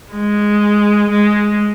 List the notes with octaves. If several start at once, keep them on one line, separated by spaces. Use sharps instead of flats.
G#3
G#3